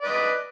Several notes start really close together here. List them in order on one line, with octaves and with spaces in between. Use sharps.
D5 B4 D#5